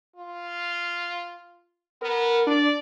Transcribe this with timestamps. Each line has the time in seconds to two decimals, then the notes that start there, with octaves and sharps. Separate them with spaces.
0.16 F4
2.02 B3 A#4
2.47 D4 D5